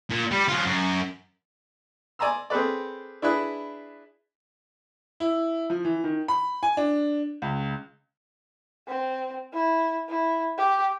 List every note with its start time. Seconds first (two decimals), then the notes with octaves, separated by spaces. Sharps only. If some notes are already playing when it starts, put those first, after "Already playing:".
0.11 A#2
0.31 G3
0.48 F#3 F4
0.65 F#2
2.19 D5 G#5 A#5 C6 E6
2.50 C4 G#4 A4 B4 D5
3.22 D4 E4 G#4 B4
5.20 E4
5.70 F3
5.85 E3
6.04 D#3
6.28 B5
6.63 G#5
6.77 D4
7.42 C#2
8.88 C4
9.53 E4
10.09 E4
10.58 G4